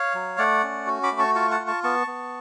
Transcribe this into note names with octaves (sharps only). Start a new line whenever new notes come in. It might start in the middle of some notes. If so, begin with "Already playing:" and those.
Already playing: C#5 F5
F#3
A3 D5 F#5
C#4
F#4
B5 D6
A3
A5 C#6
F4 A5 C#6
F#5 A5
F4
A5 C#6
B3 A5 C#6
B3